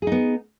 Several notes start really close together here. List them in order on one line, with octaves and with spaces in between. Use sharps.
G#4 D#4 B3